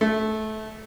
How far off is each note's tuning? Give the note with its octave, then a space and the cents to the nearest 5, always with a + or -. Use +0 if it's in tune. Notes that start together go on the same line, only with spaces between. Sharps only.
A3 -20